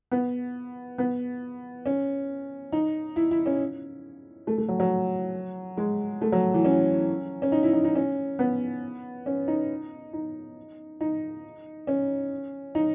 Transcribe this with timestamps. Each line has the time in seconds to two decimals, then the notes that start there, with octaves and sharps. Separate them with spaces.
0.11 B3
0.98 B3
1.86 C#4
2.72 D#4
3.16 E4
3.31 E4
3.46 C#4
4.47 A3
4.58 A3
4.69 F#3
4.80 F#3
5.77 G#3
6.21 A3
6.32 F#3
6.54 E3
6.65 C#4
7.42 C#4
7.52 D#4
7.63 E4
7.73 D#4
7.84 D#4
7.95 C#4
8.39 B3
9.26 C#4
9.48 D#4
10.13 D#4
11.01 D#4
11.87 C#4
12.75 D#4